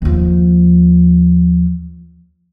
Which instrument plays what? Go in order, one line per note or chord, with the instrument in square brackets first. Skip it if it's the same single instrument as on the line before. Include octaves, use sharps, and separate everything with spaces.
[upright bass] D#2 F3